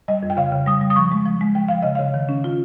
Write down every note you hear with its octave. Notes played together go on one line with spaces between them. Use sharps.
G3 D#5
F2
G5
C#3 F5
C#3
G3 D#6
G3
D#6
F3 C#6
G#3
F3
G#3
F3 G5
F3 F5
C#3 D#5
C#3 F5
D#3
C#4
F4